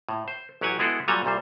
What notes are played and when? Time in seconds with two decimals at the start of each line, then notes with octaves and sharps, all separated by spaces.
0.09 A2
0.28 C5
0.61 A1 F#3 G4 F#5 G#5
0.79 G#3 B3 E4 F#4 G#4 A4
1.08 A#2 F#3 G3 A4 G#5 A#5
1.25 C2 A#2 G3 C5